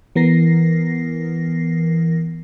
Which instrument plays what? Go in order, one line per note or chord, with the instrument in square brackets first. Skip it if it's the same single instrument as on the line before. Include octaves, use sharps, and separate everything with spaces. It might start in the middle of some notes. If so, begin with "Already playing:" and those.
[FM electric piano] E3 B3 A#4 A#6 C7